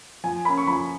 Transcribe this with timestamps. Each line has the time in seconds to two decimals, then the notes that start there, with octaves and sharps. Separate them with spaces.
0.24 F3 G#5
0.45 A#3 C#4 B5
0.57 C#6
0.67 F3 B5